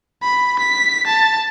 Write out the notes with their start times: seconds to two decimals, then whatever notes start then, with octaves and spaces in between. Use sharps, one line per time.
0.22 B5
0.59 B6
1.07 A5